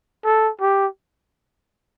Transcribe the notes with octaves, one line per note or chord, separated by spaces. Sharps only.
A4
G4